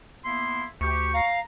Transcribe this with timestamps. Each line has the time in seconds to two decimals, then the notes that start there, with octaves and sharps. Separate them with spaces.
0.25 A#3 B3 E4 C6
0.81 D2 G4 C#6
1.13 F5 A#5